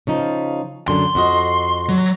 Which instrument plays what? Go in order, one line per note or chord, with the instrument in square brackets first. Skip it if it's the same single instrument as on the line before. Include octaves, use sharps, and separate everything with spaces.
[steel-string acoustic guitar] C#3 F3 D#4
[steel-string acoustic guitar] F#2 D3 [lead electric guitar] C6
[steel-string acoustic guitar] F2 F#4 D#5
[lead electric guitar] F#3